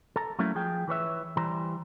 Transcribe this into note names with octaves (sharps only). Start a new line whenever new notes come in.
A4 A#5
F#3 A3 A#3 C#4 E4
F3 G#4 G5
E3 B4 C#5 E5
E3 G3 C5 A#5